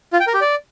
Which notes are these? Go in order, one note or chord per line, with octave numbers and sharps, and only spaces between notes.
F4
G5
A#4
G4
D5